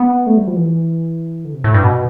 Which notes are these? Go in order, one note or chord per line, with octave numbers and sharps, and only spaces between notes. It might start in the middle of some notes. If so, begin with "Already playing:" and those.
Already playing: B3
A3
G3
F3
E3
D3
C3
A2
G2
B2